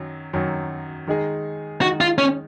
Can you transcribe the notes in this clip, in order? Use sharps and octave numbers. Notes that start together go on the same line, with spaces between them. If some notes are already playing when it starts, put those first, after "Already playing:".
Already playing: F#2 D#3 F#3
F#2 D#3 F#3
D#3 G#3 D#4 G#4
D#3 G#3 D#4 F#4 G#4
F4
C#4